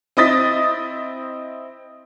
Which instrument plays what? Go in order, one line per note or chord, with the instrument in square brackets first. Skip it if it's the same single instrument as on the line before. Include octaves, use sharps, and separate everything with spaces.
[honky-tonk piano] C4 E4 D#5 D#6 A6 B6